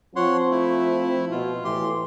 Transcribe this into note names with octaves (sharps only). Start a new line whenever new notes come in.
F3 C4 C#5 F#5 C6
A3 E4
B2 F4
A2 E3 G4 C6